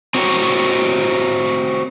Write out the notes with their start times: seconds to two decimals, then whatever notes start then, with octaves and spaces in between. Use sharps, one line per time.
0.15 C4 F#4 G4 A#4 C#5